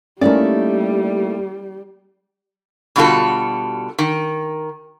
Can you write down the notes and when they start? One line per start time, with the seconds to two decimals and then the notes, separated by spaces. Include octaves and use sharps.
0.21 G3 A3 A#3 C#4 D#4 E4 A#4 D5
2.96 B2 D3 G3 F4 F#4 A4
3.99 D#3